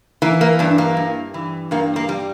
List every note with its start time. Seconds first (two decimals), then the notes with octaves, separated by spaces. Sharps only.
0.22 E3 A#3
0.41 A#3
0.59 G2 D4
0.78 A#3
0.97 G2
1.34 E3
1.71 G2 A#3
1.96 A#3
2.09 G3